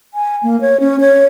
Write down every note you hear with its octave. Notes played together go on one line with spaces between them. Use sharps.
G#5
A#3
C#5
C#4
C#5